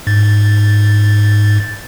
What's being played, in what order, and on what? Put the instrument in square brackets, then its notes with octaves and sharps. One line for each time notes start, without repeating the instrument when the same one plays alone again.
[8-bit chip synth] G#2 A6